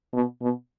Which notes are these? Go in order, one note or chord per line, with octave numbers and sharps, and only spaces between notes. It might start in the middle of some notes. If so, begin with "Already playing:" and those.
B2
B2